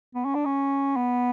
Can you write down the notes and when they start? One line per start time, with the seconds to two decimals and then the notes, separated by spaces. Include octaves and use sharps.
0.15 B3
0.25 C#4
0.35 D4
0.46 C#4
0.97 B3